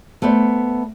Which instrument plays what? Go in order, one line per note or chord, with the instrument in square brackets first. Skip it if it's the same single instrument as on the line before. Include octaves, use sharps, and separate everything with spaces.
[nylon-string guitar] A3 B3 C5 D5